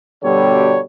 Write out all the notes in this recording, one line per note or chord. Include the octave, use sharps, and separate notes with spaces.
B2 D3 G3 C#5